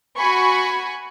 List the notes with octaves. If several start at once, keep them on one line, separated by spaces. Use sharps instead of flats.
F#4 G#5 B5 C#6